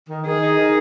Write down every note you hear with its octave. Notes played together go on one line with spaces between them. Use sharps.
D#3
D#3 G#4
D#4
D#3